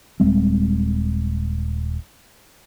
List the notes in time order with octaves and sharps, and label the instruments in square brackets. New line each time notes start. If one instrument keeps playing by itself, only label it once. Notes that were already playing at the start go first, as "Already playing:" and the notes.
[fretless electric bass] D#1 G3 G#3 C4